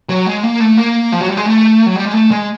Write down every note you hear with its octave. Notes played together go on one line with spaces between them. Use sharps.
F#3
G#3
A#3
A3
A#3
F3
F#3
G3
G#3
A3
F#3
G3
G#3
A3
G#3